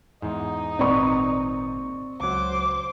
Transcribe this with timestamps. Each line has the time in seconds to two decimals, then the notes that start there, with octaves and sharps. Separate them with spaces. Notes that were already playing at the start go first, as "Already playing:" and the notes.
0.22 E2 G#2 D#4
0.79 G#1 A#2 C4 B4 D5 C#6
2.21 C#2 F#3 C5 D6